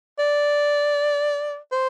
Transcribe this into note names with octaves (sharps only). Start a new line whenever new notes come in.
D5
C5